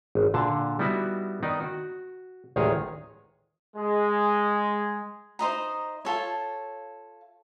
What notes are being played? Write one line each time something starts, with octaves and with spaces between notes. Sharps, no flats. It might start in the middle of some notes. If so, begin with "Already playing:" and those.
G#1
A#2 D3 A5
G3 B3 D#4 E4 F#4
D#3 B3 D#4 D5
F#4
A1 D2 D#3 G#3 G#4 C#5
G#3
D#4 C5 D#5 A#5
F4 A4 C#5